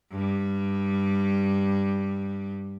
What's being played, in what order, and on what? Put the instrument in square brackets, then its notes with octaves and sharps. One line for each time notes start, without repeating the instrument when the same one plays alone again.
[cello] G2 G3